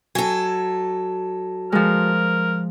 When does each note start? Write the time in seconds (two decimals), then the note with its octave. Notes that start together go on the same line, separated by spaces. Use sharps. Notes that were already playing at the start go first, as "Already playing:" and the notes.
0.15 F#3 A4 G#5
1.72 F3 G#3 A#4